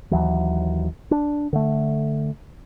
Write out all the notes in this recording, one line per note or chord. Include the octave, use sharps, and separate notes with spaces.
D#2 E3 F#3
D4
D3 A3